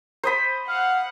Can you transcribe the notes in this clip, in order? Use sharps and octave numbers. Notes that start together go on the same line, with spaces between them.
C5 D#5 B5
F5 F#5